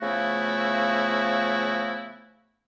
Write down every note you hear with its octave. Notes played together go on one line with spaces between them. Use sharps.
C#3 F3 A3 B3 E4 F#4